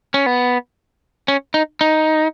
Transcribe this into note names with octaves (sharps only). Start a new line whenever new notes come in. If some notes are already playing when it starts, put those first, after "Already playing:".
C#4
B3
C#4
D#4
D#4